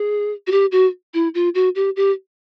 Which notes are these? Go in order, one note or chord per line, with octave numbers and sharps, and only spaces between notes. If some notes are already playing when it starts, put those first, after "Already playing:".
Already playing: G#4
F#4
G4
F#4
E4
F4
F#4
G4
G4